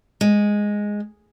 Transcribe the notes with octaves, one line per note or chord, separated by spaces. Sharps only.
G#3